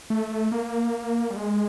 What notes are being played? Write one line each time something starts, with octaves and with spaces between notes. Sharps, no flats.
A3
A#3
G3
G#3